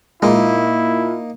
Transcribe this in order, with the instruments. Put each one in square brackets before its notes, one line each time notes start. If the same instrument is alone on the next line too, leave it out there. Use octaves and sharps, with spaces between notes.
[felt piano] A#2 [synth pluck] G#3 [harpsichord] A#3 D#4 [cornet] E4